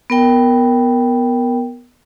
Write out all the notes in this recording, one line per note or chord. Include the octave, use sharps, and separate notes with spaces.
B3 A#4 G5